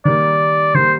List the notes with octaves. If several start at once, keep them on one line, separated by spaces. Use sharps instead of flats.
D#3 G3 A#3 D5
D#3 G3 A#3 C5